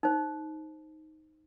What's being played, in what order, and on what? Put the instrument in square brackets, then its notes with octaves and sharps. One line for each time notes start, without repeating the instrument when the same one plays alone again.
[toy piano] D#4 C5